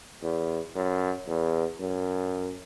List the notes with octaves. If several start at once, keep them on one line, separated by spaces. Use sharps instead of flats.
E2
F#2
E2
F#2